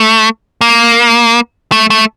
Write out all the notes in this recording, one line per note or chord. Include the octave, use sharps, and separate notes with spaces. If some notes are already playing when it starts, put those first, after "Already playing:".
Already playing: A3
A#3
A3
A3